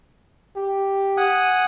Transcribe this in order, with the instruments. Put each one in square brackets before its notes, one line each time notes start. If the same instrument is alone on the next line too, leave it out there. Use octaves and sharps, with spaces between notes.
[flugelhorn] G4
[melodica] F#5 G#5 D#6